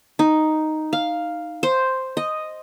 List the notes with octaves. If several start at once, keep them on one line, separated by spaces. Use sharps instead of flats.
D#4
F5
C5
D#5